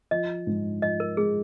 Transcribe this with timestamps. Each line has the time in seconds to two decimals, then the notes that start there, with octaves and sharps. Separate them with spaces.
0.11 F3 D#5
0.47 G#2
0.82 F3 D#5
1.00 A#4
1.17 G#3 G#4